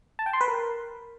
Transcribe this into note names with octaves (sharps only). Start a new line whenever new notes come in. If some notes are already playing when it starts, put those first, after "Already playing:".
A5
G5
C6
B4
A#4